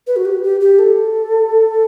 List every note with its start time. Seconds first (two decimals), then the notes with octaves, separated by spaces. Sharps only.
0.07 B4
0.16 F#4
0.25 G4
0.43 G4
0.61 G4
0.79 A4